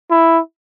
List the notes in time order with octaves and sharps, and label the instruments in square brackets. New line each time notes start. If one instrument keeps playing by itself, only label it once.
[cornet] E4